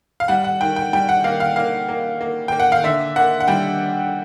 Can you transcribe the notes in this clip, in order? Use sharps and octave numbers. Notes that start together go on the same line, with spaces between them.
F5
G3 F#5
F#5
D#3 G5
G5
G3 G5
F#5
A#3 F5
F5
A#3 F5
A#3
A#3
A#3 G5
F#5
F5
D3 E5
A#3 F#5
F#5
G3 G5